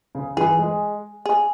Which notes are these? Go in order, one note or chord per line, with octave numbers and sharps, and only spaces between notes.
C#3
E3 G#4
G#3
G#4